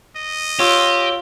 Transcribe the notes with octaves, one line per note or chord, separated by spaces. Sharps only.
D#5
F4 G4 C#5 E6